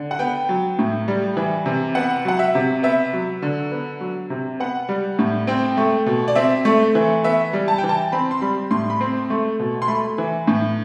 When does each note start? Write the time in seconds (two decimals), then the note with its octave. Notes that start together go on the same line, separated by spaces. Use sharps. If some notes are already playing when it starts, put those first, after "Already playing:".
Already playing: D3
0.11 F#5
0.19 B3 G5
0.49 F#3
0.79 A2
1.08 G3
1.37 E3
1.66 C3
1.95 B3 F#5
2.25 F#3 F#5
2.39 E5
2.55 C3
2.83 B3 E5
3.13 F#3
3.42 D3
3.72 B3
4.01 F#3
4.30 C3
4.60 B3 F#5
4.89 G3
5.19 A2
5.47 C4 G5
5.77 A3
6.06 B2
6.28 D5
6.35 C4 E5
6.65 A3
6.95 E3
7.24 B3 E5
7.53 G3
7.68 A5
7.78 G5
7.83 E3
7.89 A5
8.12 C4 B5
8.31 C6
8.42 G3 B5
8.71 A2 C6
8.90 B5
9.01 C4 C6
9.30 A3
9.59 B2
9.82 C6
9.88 A3 B5
10.18 E3
10.47 A2